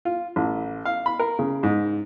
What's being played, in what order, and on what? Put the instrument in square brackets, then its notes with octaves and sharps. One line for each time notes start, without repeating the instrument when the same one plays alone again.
[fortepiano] F4
A1
F5
B5
A#4
C#3
G#2